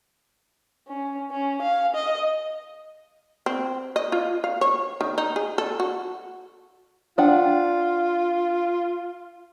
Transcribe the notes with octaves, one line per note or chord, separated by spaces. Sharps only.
C#4
C#4
F5
D#5
C4
D#5
F4
F5
C#5
D#3
D#4
G#4
A4
F#4
D4 F4 F#5 G5